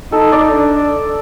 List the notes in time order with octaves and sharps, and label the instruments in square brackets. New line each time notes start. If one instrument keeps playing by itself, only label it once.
[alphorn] D#4 [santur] A4
[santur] D5
[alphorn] D4